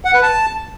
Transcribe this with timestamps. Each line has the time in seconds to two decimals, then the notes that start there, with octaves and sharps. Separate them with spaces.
0.05 F#5
0.14 B4
0.23 A5